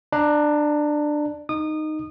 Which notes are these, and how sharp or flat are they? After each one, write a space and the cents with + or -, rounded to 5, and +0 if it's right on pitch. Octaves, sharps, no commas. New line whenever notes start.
D4 +15 A#5 +0
D#4 -10 D#6 -25